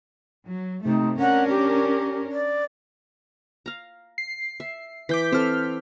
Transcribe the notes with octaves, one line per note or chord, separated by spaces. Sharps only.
F#3
C3 A3 D#4
C#4 D4 A#4 F#5
G4
D5
F5 A#5
C7
E5
E3 D6 G6 B6
C4 A4 C5 F6